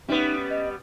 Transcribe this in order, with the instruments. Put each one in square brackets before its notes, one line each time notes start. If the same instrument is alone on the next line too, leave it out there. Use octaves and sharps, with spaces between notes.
[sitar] G3 B3 [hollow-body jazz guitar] C#4 E5 [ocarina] D#4
[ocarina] D#5